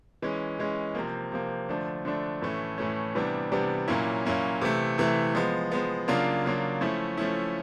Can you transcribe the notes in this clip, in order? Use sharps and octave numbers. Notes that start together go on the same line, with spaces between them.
E3 G#3 C#4
E3 G#3 C#4
C3 F3 A#3
C3 F3 A#3
D3 F3 A3 D4
D3 F3 A3 D4
A2 E3 A3 C#4
A2 E3 A3 C#4
C3 E3 G3 B3 D4
C3 E3 G3 B3 D4
A#2 F#3 A#3 C#4 E4
A#2 F#3 A#3 C#4 E4
C3 E3 A3
C3 E3 A3
F3 G#3 B3
F3 G#3 B3
C#3 F#3 A#3 D4 F4
C#3 F#3 A#3 D4 F4
F3 A3 C#4 E4
F3 A3 C#4 E4